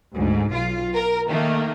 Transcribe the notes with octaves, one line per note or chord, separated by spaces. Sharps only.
D2 G#2
B1 F4
A#4
D#3 A3 A#3